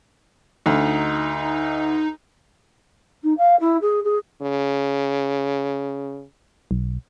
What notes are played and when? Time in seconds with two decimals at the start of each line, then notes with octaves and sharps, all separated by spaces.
0.66 D2 D#4
3.23 D#4
3.37 F5
3.60 E4
3.81 G#4
4.04 G#4
4.42 C#3
6.71 B1